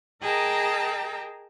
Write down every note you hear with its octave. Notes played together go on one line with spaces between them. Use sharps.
G#4 A#4 D#5 G5 A5 A#5